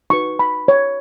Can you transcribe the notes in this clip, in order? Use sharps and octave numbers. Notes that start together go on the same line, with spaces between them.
D#4 F#4 B4 C#6
B5
C#5